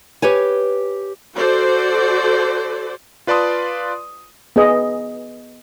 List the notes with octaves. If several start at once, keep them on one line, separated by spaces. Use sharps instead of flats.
G4 B4 C#5 G#5
F#4 A4 C5 D5
F4 B4 D5 A5 C6 D#6
B3 G#4 D#5